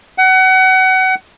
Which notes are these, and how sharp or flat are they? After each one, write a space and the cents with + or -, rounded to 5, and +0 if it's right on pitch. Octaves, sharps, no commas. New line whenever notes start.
F#5 +25